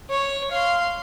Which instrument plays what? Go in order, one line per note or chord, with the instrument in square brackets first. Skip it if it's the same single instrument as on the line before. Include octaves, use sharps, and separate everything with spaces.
[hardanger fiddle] C#5
F5 C6